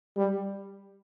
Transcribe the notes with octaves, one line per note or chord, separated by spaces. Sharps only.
G3